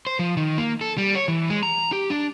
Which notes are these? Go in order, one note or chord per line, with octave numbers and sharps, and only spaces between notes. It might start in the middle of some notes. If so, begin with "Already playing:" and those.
C5
F3
D#3
A#3
A4
G3
C#5
E3
G#3
A#5
G4
D4